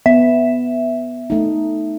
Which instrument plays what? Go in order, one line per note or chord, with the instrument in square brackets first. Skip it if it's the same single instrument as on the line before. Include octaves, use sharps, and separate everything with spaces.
[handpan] B3 [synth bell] E5
[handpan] A3 D#4